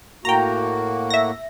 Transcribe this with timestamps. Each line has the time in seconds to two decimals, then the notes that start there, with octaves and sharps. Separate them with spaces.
0.25 A2 A#3 F#4 G5 A#5
1.10 E5 A#6